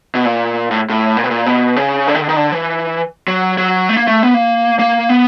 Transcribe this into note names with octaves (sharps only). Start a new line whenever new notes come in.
B2
A#2
A2
A2
A#2
B2
A#2
B2
C#3
D3
D#3
D3
D#3
D3
E3
F#3
F#3
A3
A#3
A3
B3
A#3
A#3
B3